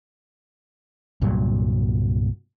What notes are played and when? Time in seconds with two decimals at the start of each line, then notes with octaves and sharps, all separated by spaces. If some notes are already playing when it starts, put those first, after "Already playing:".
1.22 C2 G2 A#2 F#3